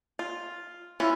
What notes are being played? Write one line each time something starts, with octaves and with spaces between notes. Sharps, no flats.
F4
E3 C#4 E4 F4